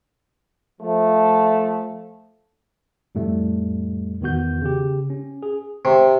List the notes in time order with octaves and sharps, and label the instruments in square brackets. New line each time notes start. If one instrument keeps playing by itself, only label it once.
[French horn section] F3 A3
[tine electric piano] F2 A2 G3 A3
E2 D#3 B3 F#4 G6
C#3 G4
C#4
G#4
[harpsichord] C3